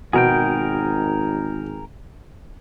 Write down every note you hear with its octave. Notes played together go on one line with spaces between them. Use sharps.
G#1 B2 G#4 A#4 G5